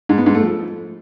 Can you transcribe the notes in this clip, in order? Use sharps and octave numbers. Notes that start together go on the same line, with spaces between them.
G#2
B3
G#2
A3
F3